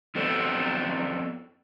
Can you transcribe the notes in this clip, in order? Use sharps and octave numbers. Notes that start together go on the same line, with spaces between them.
F2 B3 A4 C5 D5